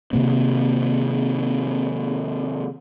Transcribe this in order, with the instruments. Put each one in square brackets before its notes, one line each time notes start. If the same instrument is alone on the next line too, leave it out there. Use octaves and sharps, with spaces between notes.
[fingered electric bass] C3 D#3 A#3 C4